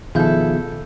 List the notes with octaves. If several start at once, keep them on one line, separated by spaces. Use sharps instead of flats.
B2 D#3 F3 E4 G#4 A4 F5 G6